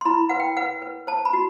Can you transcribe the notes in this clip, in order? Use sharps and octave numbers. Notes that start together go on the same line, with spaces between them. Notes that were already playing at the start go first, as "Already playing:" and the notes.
C6
E4 B5
B4 F#5
G5
B4 F#5
B4
C5 A5
B5
F#4